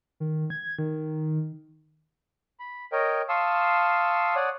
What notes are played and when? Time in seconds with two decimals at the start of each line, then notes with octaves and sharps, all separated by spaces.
0.20 D#3
0.50 G#6
0.79 D#3
2.59 B5
2.92 A#4 C#5 D#5 G5
3.29 F5 A5 C6 C#6 D#6 E6
4.35 C#5 D5 F#5 D#6